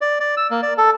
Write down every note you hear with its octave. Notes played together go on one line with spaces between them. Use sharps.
D5
D5
E6
A#3
D5
A4